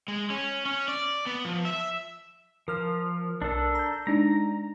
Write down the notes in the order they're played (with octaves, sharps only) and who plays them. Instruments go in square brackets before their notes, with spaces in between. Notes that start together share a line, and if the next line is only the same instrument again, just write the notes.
[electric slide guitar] G#3
C#4
C#4
D5
B3
F3
E5
[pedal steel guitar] F3 [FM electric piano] A#4 F6
[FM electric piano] B1 A#4 [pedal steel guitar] D4 A4
[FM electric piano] A#5 G6
[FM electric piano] G#3 D4 D#4 [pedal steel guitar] A#5